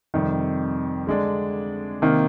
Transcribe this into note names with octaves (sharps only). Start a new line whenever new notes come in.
F2 C3 D#3 G3
D3 G#3 D4
C3 D#3 A#3